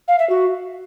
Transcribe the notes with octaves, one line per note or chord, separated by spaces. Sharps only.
F5
E5
F#4